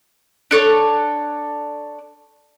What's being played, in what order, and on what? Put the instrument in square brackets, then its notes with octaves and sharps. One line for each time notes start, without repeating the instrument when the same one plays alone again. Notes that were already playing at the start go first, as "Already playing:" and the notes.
[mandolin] D4 A4 C#5